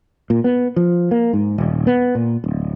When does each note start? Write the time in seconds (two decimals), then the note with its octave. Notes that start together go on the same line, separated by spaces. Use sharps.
0.30 A#2
0.44 B3
0.76 F3
1.11 A#3
1.33 G#2
1.58 D#1
1.87 B3
2.15 A#2
2.44 D1